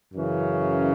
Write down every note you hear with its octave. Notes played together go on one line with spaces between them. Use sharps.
F#2 C#3 E3 C#4